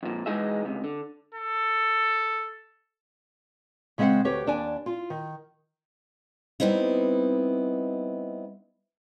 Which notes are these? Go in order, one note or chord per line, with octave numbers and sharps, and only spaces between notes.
F2 A#2
E3 G#3 D#4 G#4 E5
C#2 C3
D3
A4
C#3 G#3 C4 E5 F#5
D2 G4 B4 C#5
D#2 D4 D5 G#5
F4
D#3
G3 B3 C4 D#4 E4